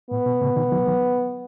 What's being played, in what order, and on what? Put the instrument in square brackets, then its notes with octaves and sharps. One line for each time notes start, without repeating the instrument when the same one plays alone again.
[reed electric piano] A2 [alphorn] B3
[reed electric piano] B2
A2 C#3
B2 D#3
D#3 F#3
D#3 F#3